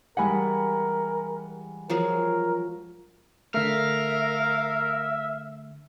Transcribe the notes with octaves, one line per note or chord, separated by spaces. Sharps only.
E3 G3 G#3 A#4 F#5 G#5 B5
F3 F#3 G#4 A#4
D3 A3 A#4 E5 F5